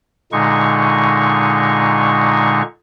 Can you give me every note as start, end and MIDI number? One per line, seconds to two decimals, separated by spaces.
0.32 2.62 46
0.32 2.62 50
0.32 2.62 56
0.32 2.62 63
0.32 2.62 85